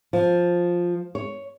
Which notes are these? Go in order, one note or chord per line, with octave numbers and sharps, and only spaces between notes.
F3
C#5